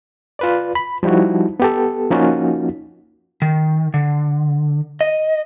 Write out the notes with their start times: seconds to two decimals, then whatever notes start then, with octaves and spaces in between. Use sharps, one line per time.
0.39 F4 B4 D5
0.75 B5
1.03 F3 G3 D#4 E4 F#4
1.60 B3 G4 A4
2.11 F3 A#3 C#4 D#4 F4 F#4
3.42 D#3
3.94 D3
5.01 D#5